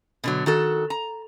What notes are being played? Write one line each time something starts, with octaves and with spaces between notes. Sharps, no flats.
B2 D3 F#3
D#3 F#4 A4
A#5